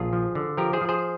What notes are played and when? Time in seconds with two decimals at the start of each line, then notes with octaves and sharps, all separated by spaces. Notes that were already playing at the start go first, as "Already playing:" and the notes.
Already playing: A#1 F4 G#4
0.13 F3
0.35 D3
0.57 F3 G4 A#4
0.73 G#4 C5
0.81 F3
0.89 G#4 C5